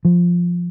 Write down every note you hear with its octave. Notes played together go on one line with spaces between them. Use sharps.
F3